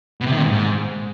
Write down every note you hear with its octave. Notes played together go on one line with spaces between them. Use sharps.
B2
C3
D#3
A#2
G#2